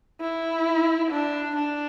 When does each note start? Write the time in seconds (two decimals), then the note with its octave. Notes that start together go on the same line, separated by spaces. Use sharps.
0.21 E4
1.11 D4
1.56 D4